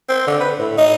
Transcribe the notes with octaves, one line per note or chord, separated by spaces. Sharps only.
C4
D3
B4
A2
D#4